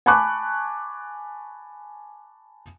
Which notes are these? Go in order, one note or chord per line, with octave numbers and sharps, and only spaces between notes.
G#5 A5 B5 C#6 D6 F#6